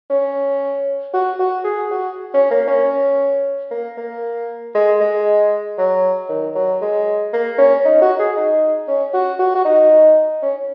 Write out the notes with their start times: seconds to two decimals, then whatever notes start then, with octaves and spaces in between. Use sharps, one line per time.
0.10 C#4
1.14 F#4
1.39 F#4
1.64 G#4
1.91 F#4
2.34 C#4
2.51 A#3
2.68 C#4
3.71 A#3
3.97 A#3
4.75 G#3
5.01 G#3
5.78 F#3
6.29 D#3
6.55 F#3
6.81 G#3
7.33 A#3
7.58 C#4
7.85 D#4
8.02 F#4
8.19 G#4
8.37 D#4
8.88 C#4
9.14 F#4
9.39 F#4
9.55 F#4
9.65 D#4
10.43 C#4